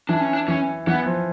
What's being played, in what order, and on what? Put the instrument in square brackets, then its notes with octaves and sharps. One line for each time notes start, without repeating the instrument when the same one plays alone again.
[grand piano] E3 [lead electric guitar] D4
[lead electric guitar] C#4
D4
[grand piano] E3 [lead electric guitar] C#4
[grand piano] E3 [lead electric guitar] B3
[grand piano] F3